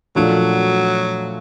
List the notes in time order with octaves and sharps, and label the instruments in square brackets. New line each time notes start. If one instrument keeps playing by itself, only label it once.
[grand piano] A#2 F3 A3 D4 F#4 [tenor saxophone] F#3